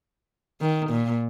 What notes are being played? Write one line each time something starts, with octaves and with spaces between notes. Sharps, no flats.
D#3
A#2